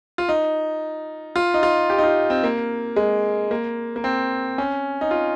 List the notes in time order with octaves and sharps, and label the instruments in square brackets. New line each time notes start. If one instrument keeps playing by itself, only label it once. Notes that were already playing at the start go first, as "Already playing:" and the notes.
[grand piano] F4
D#4
F4
D#4
F4
G4
D#4
F4
C4
A#3
G#3
A#3
A#3
C4
C#4
D#4
F4